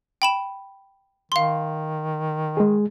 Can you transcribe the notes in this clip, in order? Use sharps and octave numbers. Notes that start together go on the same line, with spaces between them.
G5 B5 E7
D#3 F5 C6
G#3 G#4